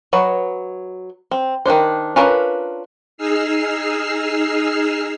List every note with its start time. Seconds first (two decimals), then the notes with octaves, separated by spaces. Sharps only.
0.13 F#3 B4 C#5 D#5
1.31 C4
1.66 D#3 F#3 D4 C5
2.16 C#4 D4 F4 A#4 B4
3.17 D#4 G#4 E6 F6 C7